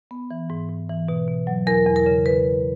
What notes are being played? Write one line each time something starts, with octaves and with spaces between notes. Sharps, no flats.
B3
E3
G#2
G#2
E3
B2
B2
F#3
E2 A#4
E2
A#4
C#3
B4